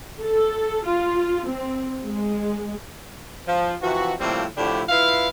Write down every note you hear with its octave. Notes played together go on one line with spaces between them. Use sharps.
A4
F4
C4
G#3
F3
C3 E3 F3 F#4
A2 C3 F3 G3 A#3 C4
A2 D3 F3 D4 E4 G4
E4 F4 B4 F5